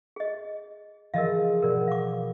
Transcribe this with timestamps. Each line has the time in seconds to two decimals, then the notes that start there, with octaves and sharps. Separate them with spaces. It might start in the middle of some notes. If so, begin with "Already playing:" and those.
0.16 G#4 D#5
1.14 E3 F3 G#4 A#4 D#5 F5
1.63 B2 B3 A#4 D5
1.88 F5 D6